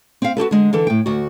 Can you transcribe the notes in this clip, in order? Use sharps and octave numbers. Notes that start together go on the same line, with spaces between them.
C4 F5
F#4 G4 A4 B4
D3 G#3
D3 E3 A4
A2 G5
D2 F#4